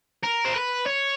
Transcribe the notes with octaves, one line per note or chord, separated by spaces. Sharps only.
A#4
C5
B4
C#5